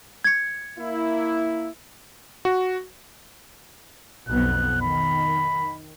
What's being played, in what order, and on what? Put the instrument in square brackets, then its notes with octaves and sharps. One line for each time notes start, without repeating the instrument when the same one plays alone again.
[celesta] G#6 C#7
[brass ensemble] A#3 E4
[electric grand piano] F#4
[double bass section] B1 F2 B3 [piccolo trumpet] F#6
[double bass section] D#3 [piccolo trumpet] B5